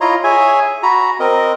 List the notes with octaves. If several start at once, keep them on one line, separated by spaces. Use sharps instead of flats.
E4 F4 C#5 D#5 A#5 C6
G#4 C#5 E5 G#5
F#4 A#5 B5
C4 A#4 D#5